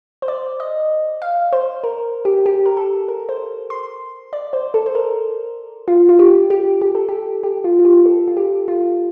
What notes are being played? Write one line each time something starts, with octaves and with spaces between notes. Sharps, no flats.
C5
D5
D#5
F5
C5
A#4
G4
G4
A#4
A4
A#4
C5
C6
D5
C5
A4
C5
A#4
F4
F4
G4
G4
G4
A4
G4
G4
F4
F4
G4
A4
F4
G4
F4